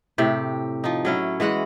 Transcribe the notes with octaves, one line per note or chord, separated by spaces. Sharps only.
A2 C3 G4
F3 D#4
F#3 C#4 E4
E3 G#3 F#4 F#5